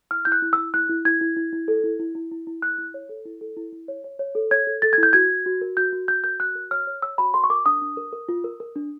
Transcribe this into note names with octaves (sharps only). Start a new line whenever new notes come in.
E4 F6
E4 G6
F#6
E4
E4 E6
E4 F#6
E4
E4 G#6
E4
E4
E4
A4
E4
E4
E4
E4
E4
E4 F#6
E4
C#5
A4
E4
A4
E4
E4
C#5
C#5
C#5
A4
C#5 G#6
A4
A4 A6
E4 G#6
G6
F#4 G#6
F#4
F#4
A#4
F#4 G6
F#4
F#4 G6
A#4 G6
F#4 F#6
A#4
C#5 F6
C#5
C#5 E6
F#4 B5
A#4 C6
C#6
A#4 D6
D4 D#6
D4
A#4
A#4
F4
A#4
A#4
D4